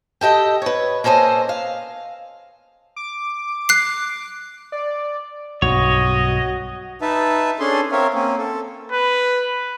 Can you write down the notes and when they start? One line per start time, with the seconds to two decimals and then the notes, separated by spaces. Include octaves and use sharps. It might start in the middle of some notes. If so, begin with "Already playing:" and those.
0.21 G4 A4 D#5 G5
0.62 B4 C#5
1.04 A#3 C#4 A4 C5 D#5
1.49 F5
2.96 D6
3.69 F#6 C7
4.72 D5
5.62 B1 G2 F#4 C#5 D#5
7.01 D#4 B4 E5 A5
7.60 C#4 D4 G#4 A4 C6
7.92 C4 A#4 C#5 E5 F5
8.14 A#3 C4 C#4
8.38 A4
8.91 B4